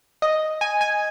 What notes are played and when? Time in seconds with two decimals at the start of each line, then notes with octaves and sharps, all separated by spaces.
0.22 D#5
0.61 G#5
0.81 G#5